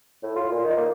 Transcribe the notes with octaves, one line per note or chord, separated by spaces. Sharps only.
A2
F4
A#2
D#3
A#3